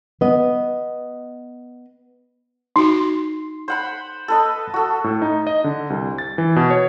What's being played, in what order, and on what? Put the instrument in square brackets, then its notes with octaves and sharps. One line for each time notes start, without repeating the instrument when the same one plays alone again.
[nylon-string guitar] B3 D#5
[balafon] D#4 F#4 [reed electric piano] C6
[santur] C5 F#5 B5
A4 B4 D#5
F#4 A4
[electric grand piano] A2
D#4
D#5
D3
C2
A6
E3
B2
C#5